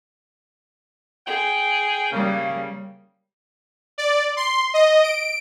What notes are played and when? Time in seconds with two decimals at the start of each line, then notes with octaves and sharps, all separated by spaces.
1.27 G#4 G5
2.12 C#3 G3 A#3
3.98 D5
4.37 C6
4.74 D#5
5.03 D7